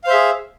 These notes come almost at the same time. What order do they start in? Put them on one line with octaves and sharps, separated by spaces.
F5 C5 E5 G#4